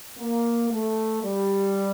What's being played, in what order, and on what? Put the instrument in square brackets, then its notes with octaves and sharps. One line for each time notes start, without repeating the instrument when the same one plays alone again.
[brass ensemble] A#3
A3
G3